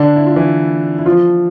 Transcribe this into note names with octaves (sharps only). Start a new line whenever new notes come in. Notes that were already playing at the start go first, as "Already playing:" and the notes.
Already playing: D3 D4
E4
F4
E3 E4
E4
F3 F4